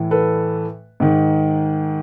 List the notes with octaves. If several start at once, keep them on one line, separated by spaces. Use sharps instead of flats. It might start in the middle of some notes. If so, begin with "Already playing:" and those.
Already playing: A2 E3
A4 B4
G#2 D#3